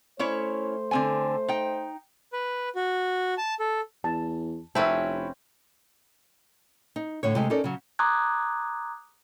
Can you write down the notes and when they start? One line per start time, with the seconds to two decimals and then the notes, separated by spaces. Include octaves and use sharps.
0.19 A3 C#4 E4 C5 C#5
0.91 D3 C4 G#5
1.48 D#4 G5
2.33 B4
2.75 F#4
3.38 A5
3.60 A4
4.04 E2 A5
4.75 F1 C4 C#4 E4 B4 C#5 E5 A5
6.96 D#4
7.23 A2 D3 C#5
7.35 C3 G#3 A3
7.50 C#4 D#4 A4 A#4 D5
7.64 C#3 F#3
7.99 A#5 C6 D6 D#6 F#6 G#6